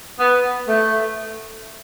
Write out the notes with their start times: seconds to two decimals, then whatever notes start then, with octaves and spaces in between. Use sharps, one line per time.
0.19 B3
0.67 A3